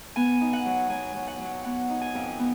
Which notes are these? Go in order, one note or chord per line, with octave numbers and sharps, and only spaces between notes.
B3 G#5
D#4
F#5
F#3
F#3 G#5
F#3
F#5
F#3
B3 F#5
D#4
G#5
F2
B3